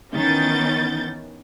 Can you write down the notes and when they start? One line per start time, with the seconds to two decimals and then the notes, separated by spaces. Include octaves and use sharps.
0.14 D#3 E3 B3 C#4 G6 A6